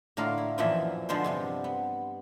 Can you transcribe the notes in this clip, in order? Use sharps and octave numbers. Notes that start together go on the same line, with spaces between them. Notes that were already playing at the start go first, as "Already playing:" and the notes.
A2 D3 A#3 F4 A#4 F5
E4
F#2 A#2 E3 F3 D#5 E5
D3 F3 G#3 B3 C5
G2 C3 B3
B3